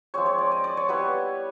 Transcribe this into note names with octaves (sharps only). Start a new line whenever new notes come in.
F3 G#3 C4 C#5
C#5
D5
D#5
D5
C#5
G3 B3 E4 B4